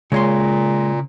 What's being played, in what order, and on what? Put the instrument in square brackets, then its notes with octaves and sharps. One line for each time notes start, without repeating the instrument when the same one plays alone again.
[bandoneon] A#2 [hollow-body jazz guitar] C#3 C#5 C6 [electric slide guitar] G#3